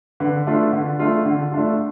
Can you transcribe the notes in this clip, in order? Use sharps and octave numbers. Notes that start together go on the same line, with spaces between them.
D3 B4
A3 D4 F4
D3
A3 D4 F4
D3
A3 D4 F4